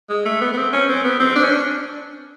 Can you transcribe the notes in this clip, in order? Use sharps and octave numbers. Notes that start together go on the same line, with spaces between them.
G#3
A3
B3
B3
C4
C#4
C4
B3
C4
D4
C#4
D4